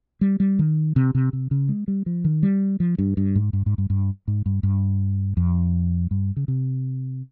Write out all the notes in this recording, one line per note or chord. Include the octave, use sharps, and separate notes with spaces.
G3
G3
D#3
C3
C3
C3
C#3
G#3
G3
F3
D#3
G3
F3
G2
G2
G#2
G2
G#2
G2
G2
G#2
G2
G2
F2
G2
C#3
C3